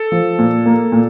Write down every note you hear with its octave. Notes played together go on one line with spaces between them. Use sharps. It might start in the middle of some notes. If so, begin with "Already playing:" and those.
Already playing: A4
F3
A#2
A#3
A#2